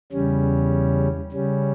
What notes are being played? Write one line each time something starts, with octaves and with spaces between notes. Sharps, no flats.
E2 C#3 G3 C#4
C#3 G3 C#4